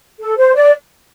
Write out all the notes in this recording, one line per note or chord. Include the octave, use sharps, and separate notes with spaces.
A4
C5
D5